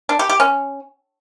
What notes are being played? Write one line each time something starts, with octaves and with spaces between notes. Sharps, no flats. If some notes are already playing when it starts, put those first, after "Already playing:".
D4
G4
G4
C#4